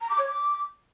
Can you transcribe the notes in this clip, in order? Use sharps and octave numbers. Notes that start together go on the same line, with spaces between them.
A#5
D6
C#5
D6